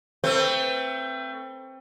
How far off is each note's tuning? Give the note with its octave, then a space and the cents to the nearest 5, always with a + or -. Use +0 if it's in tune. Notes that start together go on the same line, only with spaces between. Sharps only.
A3 +30 C4 +10 B4 +10